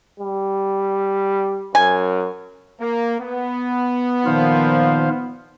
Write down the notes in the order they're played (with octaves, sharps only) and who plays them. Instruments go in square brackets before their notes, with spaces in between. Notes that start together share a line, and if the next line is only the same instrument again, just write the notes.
[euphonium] G3
[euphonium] F#2 [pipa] G#5
[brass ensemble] A#3
B3
[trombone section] A#2 F3 [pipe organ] D#3 C5 F5